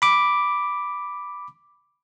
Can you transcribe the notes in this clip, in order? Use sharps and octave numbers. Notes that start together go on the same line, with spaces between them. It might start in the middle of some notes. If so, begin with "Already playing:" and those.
B5 D6